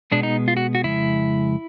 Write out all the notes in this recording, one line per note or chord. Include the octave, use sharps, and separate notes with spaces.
B2 G#3 B3 D4
D#4
F4
F#4
F#4
F2 C#3 G#3 E4